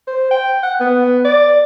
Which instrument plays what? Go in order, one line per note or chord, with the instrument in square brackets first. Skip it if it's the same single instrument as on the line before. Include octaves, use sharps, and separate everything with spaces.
[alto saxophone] C5
G5
F#5
B3
D5